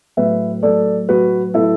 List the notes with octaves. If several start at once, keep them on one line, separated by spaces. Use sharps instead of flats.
A2 F#3 B4 E5
A2 F#3 A4 D5
A2 F#3 F#4 B4
A2 F#3 E4 A4